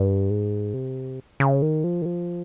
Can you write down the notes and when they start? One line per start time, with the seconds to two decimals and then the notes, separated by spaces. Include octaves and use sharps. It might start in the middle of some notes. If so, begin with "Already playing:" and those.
Already playing: G2
0.30 G#2
0.74 C3
1.40 C#3
1.62 D#3
1.84 F3
2.02 D#3
2.05 F3